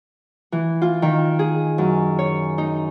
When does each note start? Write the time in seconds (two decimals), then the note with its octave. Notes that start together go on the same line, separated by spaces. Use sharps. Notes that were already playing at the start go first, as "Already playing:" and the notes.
0.52 E3
0.82 F4
1.02 D#3
1.39 G#4
1.78 F#2
2.19 C#5
2.58 D#4